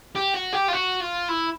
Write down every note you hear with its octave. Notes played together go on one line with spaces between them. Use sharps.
G4
F#4
G4
F4
F#4
F4
E4